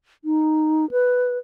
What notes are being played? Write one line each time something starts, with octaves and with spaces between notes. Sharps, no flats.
D#4
B4